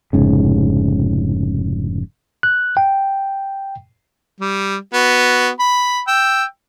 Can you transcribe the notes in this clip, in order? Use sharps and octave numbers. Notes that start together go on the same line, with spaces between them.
F1 G#2 C#3
F#6
G5
G3
B3 F#4
B5
G5 E6